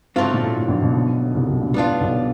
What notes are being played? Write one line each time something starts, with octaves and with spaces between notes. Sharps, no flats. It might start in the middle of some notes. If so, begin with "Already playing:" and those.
G#2 D3 F#3 A3 C4 F4
A#2
A2
A2
A#1 A#2
B1 B2
C2 C3
B1 B2
A#1 A#2
A2 G3 B3 D4 F4
A2
B1 B2